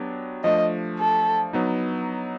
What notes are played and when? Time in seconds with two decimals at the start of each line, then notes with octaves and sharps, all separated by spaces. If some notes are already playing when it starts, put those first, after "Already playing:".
Already playing: F#3 B3 D4 G4
0.44 F3 A3 D4 D#5
0.99 A4
1.53 F#3 B3 D#4